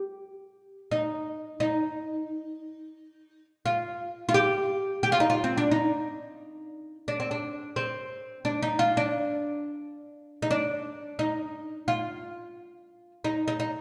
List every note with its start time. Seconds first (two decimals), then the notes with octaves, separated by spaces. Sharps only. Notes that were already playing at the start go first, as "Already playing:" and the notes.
Already playing: G4
0.92 D#4
1.60 D#4
3.66 F4
4.29 F4
4.34 G4
5.03 G4
5.12 F4
5.20 D#4
5.30 F4
5.44 C4
5.57 D4
5.71 D#4
7.08 D4
7.20 C4
7.31 D4
7.76 C4
8.45 D4
8.63 D#4
8.79 F4
8.97 D4
10.42 D#4
10.51 D4
11.19 D#4
11.88 F4
13.24 D#4
13.48 D#4
13.60 D#4